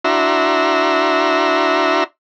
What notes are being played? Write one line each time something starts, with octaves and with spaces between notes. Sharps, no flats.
D4 E4 F#4 E5 A#5 C6